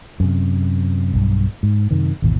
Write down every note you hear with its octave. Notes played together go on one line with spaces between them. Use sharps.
F#2 C3
B1 G2
G#2
F#2 C3 D#3
G#1 D#2 B2 E3